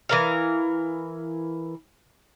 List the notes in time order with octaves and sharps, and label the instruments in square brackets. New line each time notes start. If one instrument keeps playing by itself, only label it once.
[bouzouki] E3 A#4 F5